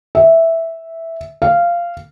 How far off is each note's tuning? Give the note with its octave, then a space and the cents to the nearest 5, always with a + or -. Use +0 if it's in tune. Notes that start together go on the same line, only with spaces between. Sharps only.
E5 -5
F5 -15